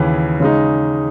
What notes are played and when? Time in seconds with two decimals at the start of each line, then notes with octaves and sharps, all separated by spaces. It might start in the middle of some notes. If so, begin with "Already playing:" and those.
Already playing: D#2 C#3 E3
0.40 C#3 G#3 D#4